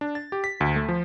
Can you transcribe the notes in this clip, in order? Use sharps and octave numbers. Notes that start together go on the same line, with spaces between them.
D4
A6
G4
B6
D2
A3
F3